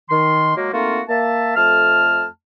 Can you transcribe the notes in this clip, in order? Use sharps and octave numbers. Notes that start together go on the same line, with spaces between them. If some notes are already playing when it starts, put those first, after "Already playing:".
D#3 C6
F#3 G#3 A#3
A3 A#3 C4 D#4 F4 F#4
A#3 E5 A5
F2 A3 A5 F6